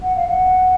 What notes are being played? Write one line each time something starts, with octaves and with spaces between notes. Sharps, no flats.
F#5
F5
F#5